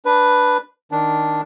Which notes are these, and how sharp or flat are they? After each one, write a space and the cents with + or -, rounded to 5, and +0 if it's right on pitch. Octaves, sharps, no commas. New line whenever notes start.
D4 +0 B4 +0
D#3 +0 D4 +0